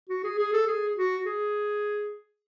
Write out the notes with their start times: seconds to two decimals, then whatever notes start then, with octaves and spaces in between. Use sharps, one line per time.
0.09 F#4
0.24 G#4
0.39 G#4
0.53 A4
0.67 G#4
0.97 F#4
1.26 G#4